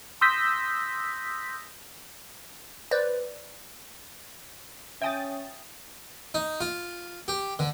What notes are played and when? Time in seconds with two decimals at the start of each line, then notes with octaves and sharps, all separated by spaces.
0.21 C6 D#6 E6 G6 A#6 B6
2.91 B4 C5 D5
5.02 C#4 E5 G5 G#5 D#6 A6
6.34 D#4
6.61 F4
7.28 G4
7.59 D3